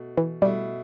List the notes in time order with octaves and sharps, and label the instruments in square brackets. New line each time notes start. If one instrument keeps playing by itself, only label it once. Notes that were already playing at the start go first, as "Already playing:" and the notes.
Already playing: [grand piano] B2 A3
[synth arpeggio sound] E3
[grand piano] B2 A3 E4 [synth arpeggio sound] G3